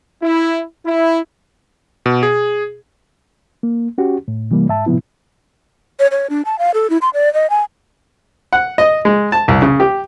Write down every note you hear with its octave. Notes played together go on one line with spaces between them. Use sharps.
E4
E4
B2
G#4
A#3
C#4 F#4 G4
A2
C3 E3 G3 A#3
G#2 E5 A5
A2 C3 F3 B3 E4
C#5
C#5
D4
A5
F5
A4
E4
C6
D5
D#5
G#5
F#5
D#5
G#3
A5
C2
C#3
G4